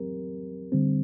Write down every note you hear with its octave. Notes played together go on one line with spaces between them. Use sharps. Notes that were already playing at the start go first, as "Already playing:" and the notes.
Already playing: F#3 C4 G4 A#4
D3 G3 C4